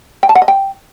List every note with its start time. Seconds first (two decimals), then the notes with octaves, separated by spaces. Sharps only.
0.23 G5
0.29 A5
0.35 F#5
0.42 D#5
0.48 G5